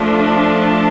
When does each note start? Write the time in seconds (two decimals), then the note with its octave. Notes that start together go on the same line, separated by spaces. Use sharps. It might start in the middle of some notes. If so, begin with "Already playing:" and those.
Already playing: F3 A3 D4
0.19 A5